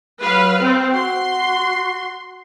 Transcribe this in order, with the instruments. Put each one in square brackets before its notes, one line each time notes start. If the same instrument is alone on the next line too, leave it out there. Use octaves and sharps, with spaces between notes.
[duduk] F#3 [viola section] B4 F5
[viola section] C4 [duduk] C5
[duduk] F#4 [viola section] C6